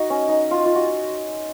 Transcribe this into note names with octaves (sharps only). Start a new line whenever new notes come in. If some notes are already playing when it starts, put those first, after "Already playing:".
Already playing: D#4 F#4
C#4
D#4
F4
F4
F#4